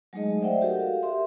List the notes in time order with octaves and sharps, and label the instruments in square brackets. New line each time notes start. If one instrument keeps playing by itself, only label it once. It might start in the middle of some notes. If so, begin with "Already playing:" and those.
[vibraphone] F#3 G#3 A3 D#4 G#4 D#5
C5 D5 E5 F#5 G5
F#4 G4 A4 A#4
F5
G4 A#4 E5 C6